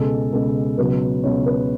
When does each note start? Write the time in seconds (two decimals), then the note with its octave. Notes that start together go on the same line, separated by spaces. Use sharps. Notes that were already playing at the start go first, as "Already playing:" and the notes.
Already playing: C#2 B2 G#3 A4
0.32 C#2 B2 G#3 A4
0.78 C#2 B2 F#3 B4
1.24 C#2 B2 F#3 C#5
1.46 B4